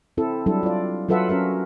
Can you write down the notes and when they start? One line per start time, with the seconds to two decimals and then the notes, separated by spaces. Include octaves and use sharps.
0.17 C4 E4 A4
0.46 F#3 G3 D4 E4 A4
0.63 F4 D5
1.08 F#3 F4 A4 B4 E5 F#5
1.29 C#4 F#4 A#4 E5